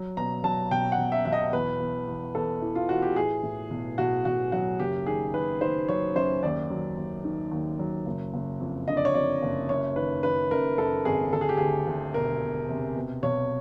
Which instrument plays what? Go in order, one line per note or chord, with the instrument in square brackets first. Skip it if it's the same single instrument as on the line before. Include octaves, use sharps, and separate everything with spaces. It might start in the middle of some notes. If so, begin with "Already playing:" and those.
Already playing: [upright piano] F#3
B2 A#5
F#3 A5
B1 G5
F#5
B1
E5
B1 E5
D#5
E2 B4
E2
E2
E2 A4
E3
F4
E3 F#4
G4
A2 G#4
A2
B1
B1 F#4
B1 F#4
F#3 F#4
F#1 G4
D#3 G#4
D#3 B4
D#3 C5
F#3 C#5
F#2 C5
D#2 D5
F#3
D#2
D#3
D#2
F#3
F#1
F#1
F2
D3 D#5
D5
C#5
F2 D5
F#1
F#2 C#5
D#3 B4
D#3 B4
F#2 A#4
F#2 A4
G#1 G#4
D2 A4
G#4
G4
D2 G#4
D2
E1 A#4
E1
C3
B2
B1 C#5